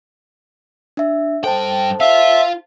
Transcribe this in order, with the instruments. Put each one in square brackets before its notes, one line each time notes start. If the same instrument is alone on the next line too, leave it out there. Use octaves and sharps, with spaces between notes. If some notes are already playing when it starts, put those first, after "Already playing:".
[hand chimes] D4 E5
[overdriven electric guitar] G2 G5 [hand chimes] A4 C5 A5
[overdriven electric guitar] F4 [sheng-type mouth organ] E5